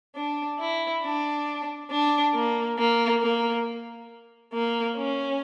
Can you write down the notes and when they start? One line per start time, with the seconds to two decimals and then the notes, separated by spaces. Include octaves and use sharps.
0.15 D4
0.59 E4
1.03 D4
1.90 D4
2.34 A#3
2.78 A#3
3.22 A#3
4.53 A#3
4.97 C#4